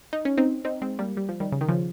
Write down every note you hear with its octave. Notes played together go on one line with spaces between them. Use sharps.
D#4
C#4
C4 D#4
C4 D#4
G#3 C4
G3 A#3
G3
F3
D#3 G3
C#3
D#3
C#3 F3